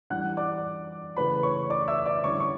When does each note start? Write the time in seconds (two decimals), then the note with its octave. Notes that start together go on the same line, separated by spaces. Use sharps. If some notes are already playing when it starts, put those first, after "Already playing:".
0.10 E3 G3 D4 F#5 F#6
0.37 D5 D6
1.17 C#3 E3 A3 B4 B5
1.43 C#5 C#6
1.70 D5 D6
1.88 E5 E6
2.06 D5 D6
2.24 D3 G3 C#4 E4 C#5 C#6
2.40 C#6